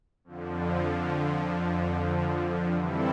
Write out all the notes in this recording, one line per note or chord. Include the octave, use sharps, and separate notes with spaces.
F2 D3 F3
E3 G3 C4 E4 A4